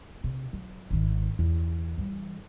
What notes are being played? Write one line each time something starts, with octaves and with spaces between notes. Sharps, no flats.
C3
F#3
G#1 D#3
E2
E3 G3